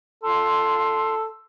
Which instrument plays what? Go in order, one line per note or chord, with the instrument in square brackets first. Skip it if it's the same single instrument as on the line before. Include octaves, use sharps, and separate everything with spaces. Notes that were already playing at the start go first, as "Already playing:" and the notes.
[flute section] F4 C6 [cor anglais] A4